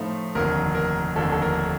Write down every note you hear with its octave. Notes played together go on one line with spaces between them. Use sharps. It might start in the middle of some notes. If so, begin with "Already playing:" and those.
Already playing: A2 F3 A3 D#4
F1 D#2 D3 A#4
A#4
F1 D#2 D3 A4
A4
A#4